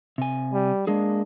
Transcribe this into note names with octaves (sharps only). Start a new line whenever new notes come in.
C3 G#5
G3
G#3 A#3 D4 G#4